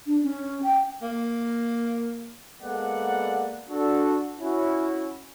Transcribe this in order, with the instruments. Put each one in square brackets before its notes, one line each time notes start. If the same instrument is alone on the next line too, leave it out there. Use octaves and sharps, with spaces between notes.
[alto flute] D4
C#4
G5
[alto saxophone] A#3
[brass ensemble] G#3 A#3 B3 A4 D5 F#5
D4 F#4 A4
C#4 E4 F#4